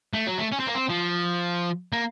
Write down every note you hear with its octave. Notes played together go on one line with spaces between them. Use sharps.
A3
F#3
A3
C#4
C4
A#3
C4
F3
A#3